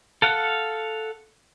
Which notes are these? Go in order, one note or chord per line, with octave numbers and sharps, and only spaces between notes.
A4 F5 F#5